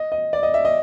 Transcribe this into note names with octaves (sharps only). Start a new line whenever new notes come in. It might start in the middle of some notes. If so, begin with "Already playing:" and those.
Already playing: D#5
D#5
D5
D#5
E5
D#5